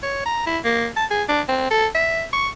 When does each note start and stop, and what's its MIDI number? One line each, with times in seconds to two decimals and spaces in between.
0.03 0.24 73
0.26 0.41 82
0.46 0.59 64
0.64 0.87 58
0.96 1.05 81
1.11 1.23 68
1.29 1.41 62
1.48 1.70 60
1.71 1.87 69
1.95 2.24 76
2.33 2.49 85